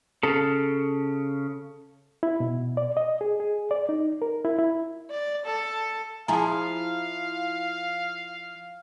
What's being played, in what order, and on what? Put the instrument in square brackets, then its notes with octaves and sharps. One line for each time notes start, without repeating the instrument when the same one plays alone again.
[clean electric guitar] C#3 [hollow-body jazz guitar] A4
[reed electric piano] E4
B2
D5
D#5
G#4
G#4
D5
D#4
A#4
E4
E4
[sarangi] D5
A4
[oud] F3 E4 G#4 [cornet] F5 [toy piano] A5 A#5